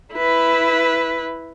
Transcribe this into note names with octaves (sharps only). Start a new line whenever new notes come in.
E4 B4